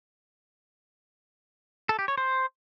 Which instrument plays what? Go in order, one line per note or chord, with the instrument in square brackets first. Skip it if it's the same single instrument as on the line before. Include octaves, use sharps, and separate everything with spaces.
[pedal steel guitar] A4
G4
C#5
C5